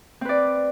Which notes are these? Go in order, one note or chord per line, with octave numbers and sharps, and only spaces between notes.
C4 B4 D5